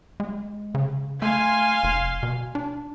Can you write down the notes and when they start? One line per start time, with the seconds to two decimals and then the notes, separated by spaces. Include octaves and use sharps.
0.20 G#3
0.75 C#3
1.22 A3 F5 G#5 C6
1.84 F1
2.23 B2
2.55 D4